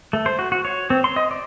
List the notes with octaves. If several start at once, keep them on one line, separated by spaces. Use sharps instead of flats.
A3
C5
F#4
F#4
C#5
C4
C6
D#5
D5